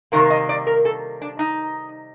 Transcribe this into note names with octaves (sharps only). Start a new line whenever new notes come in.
C3 D#3 G3 A#3 A#4
D#5
D5
A#4
A4
D4
D#4